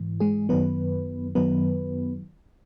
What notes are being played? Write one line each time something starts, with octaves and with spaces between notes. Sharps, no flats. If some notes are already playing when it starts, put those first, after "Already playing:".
Already playing: G#2 E3
G#3 G#4
F#2 D#3 F#3 B3 B4
F#2 D#3 F#3 B3 B4